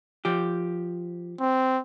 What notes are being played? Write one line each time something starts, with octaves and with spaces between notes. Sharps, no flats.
F3 G4
C4